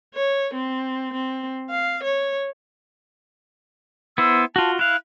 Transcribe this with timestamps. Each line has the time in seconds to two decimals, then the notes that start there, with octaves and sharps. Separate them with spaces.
0.15 C#5
0.54 C4
1.13 C4
1.70 F5
2.03 C#5
4.18 B3 E4 C5 E6
4.56 F4 F#4 A5
4.79 E4 F5 F#6